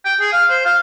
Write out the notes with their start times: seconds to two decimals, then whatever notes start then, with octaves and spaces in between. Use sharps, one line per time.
0.05 G5
0.20 G#4
0.32 F5
0.49 C5
0.65 F5